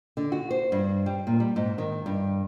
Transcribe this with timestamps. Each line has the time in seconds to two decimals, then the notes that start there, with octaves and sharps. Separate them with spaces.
0.17 D3
0.32 F#4
0.51 C5
0.72 G2
1.06 G3
1.27 A#2
1.40 G3
1.56 G#2
1.78 D#3
2.06 G2